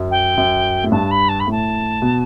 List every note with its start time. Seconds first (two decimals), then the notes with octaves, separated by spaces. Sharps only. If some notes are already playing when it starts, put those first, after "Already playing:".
Already playing: F#2
0.11 G5
0.37 F#2
0.83 A2
0.92 G2 A5
1.11 B5
1.29 A5
1.40 B5
1.47 A2 A5
2.02 B2